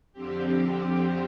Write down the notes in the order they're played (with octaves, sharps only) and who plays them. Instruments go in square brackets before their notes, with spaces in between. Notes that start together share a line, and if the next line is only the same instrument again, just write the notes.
[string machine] F2 D3 F3 C4 G4